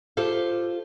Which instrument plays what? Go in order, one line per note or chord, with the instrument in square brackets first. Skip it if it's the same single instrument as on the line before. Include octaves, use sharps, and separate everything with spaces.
[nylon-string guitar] F4 G4 A4 C5 F5